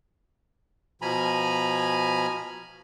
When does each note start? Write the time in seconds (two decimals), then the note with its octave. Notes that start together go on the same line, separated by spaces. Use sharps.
1.02 B2 F3 G#5 A#5 B5